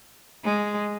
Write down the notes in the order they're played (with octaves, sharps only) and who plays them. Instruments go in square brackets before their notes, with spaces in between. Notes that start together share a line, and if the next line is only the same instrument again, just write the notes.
[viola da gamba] G#3